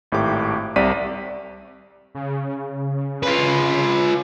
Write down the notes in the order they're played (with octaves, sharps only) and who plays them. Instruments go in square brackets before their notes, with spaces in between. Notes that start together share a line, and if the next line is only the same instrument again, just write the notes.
[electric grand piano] G#1 A2 G4 D6
C2 C3 D5 B6 D#7
[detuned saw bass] C#3
[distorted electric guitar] F4 B4